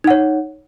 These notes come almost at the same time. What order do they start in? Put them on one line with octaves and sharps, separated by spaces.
D#4 F#5 C#5